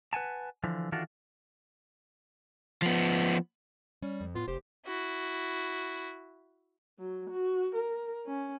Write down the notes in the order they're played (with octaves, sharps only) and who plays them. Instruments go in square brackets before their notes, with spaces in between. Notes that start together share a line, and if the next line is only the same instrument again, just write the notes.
[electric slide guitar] B4 F#5 G#5 A5
D3 E3 F3
D#3 E3 D4 F4 F#4 A4
[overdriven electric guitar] F3 B3
[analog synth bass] G3 [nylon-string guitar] C#4
[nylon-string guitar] F2
[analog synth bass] A2 [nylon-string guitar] B3 [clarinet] F4
[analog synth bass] F1 [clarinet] G4 [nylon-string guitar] C5
[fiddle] E4 F#4
[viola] F#3
F#4
A#4
C#4